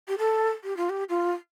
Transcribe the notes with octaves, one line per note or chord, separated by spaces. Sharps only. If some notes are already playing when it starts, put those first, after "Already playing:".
G4
A4
G4
F4
G4
F4